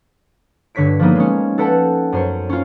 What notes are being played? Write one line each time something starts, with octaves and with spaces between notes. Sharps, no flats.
G2 D3 C#5 B6 D7
F3 G3 A#3 B3 D#4
G#3 C#4
A4 B4 F#5 G5 A5
F#2 C5 C#5
C#4 F4